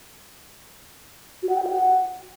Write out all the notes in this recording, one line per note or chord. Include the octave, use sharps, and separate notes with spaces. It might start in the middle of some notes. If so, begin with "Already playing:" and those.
F#4
F#5
G5
F#4
F#5